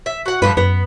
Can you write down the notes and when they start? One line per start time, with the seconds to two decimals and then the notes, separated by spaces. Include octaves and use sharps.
0.06 E5
0.26 F#4 F#5
0.42 G2 D3 F3 B4
0.57 F#2 B3